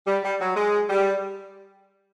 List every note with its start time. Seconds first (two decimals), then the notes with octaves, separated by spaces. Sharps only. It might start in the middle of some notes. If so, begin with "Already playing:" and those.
0.07 G3
0.23 G3
0.40 F#3
0.56 G#3
0.89 G3